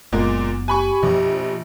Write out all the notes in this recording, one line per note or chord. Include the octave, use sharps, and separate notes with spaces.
F#1 A#2 G#3 A#3 B3
G4 G#5 B5 C#6
A#1 F2 B2 F3